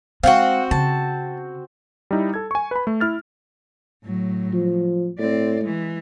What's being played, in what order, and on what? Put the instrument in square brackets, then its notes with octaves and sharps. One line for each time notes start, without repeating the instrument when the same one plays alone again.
[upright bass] G#3 [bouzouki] C4 F#4 [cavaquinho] F5 F#5
[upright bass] C#3 [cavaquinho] A5
[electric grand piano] G3 D#4 E4
A4 G#6
G#5 C#6
B4 B5
A3
E4 F6 A6
[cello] A2 F#3
[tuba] F3
[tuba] A2 [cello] C4 D5
[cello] E3 G#3